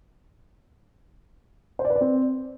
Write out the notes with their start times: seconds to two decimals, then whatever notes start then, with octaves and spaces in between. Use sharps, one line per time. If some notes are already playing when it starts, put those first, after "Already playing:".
1.79 C5
1.85 D5
1.90 B4
1.96 D5
2.01 C4